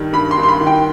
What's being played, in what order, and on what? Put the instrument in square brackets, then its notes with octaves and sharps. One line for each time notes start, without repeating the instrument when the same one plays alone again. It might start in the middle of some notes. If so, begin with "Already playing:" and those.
Already playing: [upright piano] G2 D#3 G3
G2 B5
C6
G2
C6
B5
D#3
G5